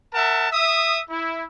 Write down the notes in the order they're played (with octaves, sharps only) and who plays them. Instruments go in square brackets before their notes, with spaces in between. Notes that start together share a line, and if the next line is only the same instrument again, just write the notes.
[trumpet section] A#4 E5 F#5 A5
E5 D#6
E4